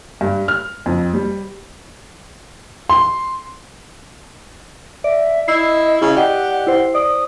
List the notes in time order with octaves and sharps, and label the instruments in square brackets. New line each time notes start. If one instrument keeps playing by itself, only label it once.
[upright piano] G2
F6
F2
G3
C6
[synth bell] D5 [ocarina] E5
[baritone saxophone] E4 [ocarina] D#5 [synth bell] E6 C7
[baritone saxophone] C#3 [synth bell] E4
[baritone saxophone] G4 [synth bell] D5 D#5 [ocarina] F#5
[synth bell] E4 C5
[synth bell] D5 [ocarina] D#6